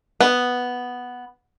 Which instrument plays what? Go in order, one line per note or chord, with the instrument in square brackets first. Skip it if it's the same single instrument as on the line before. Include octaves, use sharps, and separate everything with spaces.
[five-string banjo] B3